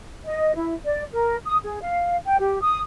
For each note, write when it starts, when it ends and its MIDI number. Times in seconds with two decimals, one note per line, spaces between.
0.24 0.54 75
0.55 0.73 64
0.84 1.05 74
1.13 1.36 70
1.45 1.57 87
1.63 1.81 68
1.82 2.15 77
2.27 2.37 79
2.39 2.60 67
2.61 2.79 87